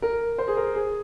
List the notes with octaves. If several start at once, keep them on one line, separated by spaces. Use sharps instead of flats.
A#4
C5
G#4
A#4
G#4